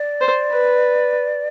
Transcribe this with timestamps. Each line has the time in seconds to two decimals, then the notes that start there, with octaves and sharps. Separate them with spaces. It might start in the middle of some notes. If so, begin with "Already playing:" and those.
Already playing: D5
0.21 C5
0.51 B4